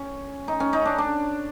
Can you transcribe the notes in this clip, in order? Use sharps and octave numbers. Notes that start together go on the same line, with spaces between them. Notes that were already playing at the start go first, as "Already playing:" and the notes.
Already playing: C#4
D#4
C#4
D#4
D4
D4